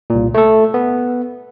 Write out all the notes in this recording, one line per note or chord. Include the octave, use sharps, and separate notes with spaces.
C2 A#2
A3 A4
B3